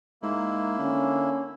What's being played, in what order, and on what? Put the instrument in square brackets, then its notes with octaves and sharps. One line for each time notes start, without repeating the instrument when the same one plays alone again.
[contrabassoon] G#2 [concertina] A#3 E4
[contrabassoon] D3 [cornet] C#4